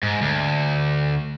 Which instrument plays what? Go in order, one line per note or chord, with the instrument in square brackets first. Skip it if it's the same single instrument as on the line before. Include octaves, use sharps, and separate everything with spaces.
[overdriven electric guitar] G#2
D2